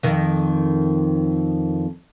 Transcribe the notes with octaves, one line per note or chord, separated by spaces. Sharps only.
F2 D#3